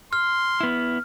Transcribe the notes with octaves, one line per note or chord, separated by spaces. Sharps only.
C6 F6
B3 E4